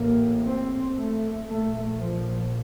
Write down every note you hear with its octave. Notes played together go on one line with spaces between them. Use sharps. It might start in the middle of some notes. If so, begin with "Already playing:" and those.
Already playing: A1 A2 A#3
C4
A3
A#1 A#2 A3
F3